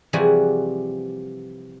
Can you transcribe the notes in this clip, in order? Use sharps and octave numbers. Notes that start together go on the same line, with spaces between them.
C3 E3 F3 G3 F#4 G#4